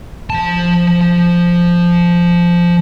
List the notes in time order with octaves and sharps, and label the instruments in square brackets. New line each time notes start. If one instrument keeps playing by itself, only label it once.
[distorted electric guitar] F3 A5